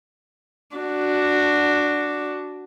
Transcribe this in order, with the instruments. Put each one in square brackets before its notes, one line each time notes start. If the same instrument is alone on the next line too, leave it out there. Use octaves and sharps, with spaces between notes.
[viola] D4 F#4